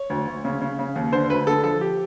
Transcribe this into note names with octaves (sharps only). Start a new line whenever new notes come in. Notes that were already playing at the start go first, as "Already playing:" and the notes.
Already playing: C#5
D2
D2
C#3
C#3
C#3
D#2
D3 C5
D2 B4
D3 A4
F3 A4
G4